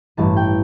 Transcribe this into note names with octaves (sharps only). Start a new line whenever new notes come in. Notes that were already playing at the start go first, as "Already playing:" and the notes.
A1 G2 E3 A5
G5